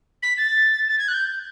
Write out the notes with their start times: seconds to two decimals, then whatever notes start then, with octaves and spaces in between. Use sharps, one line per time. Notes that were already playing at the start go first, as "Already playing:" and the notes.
0.22 B6
0.37 A6
0.88 A6
0.98 G#6
1.08 F#6
1.13 G6